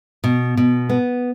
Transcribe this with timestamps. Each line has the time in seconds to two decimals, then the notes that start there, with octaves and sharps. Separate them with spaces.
0.24 B2
0.57 B2
0.89 B3